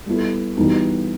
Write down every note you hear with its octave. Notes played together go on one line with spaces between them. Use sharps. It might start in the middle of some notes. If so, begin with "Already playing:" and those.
G3 B3 E4 A4
E3 G3 B3 D#4 F#4